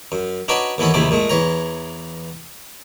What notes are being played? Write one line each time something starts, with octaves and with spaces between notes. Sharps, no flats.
F#2
D4 D#4 F#4 B4 C#5 D5
D#2 E3 B3 A4 C#5
A#1 D#2 C3 A3 E4 D5
A#2 G#3 A3
E2 E3 C#5 A#5